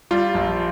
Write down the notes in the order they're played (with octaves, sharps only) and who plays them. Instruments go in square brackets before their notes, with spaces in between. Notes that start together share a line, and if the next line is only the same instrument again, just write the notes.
[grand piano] G3 [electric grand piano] F4
[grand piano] A#1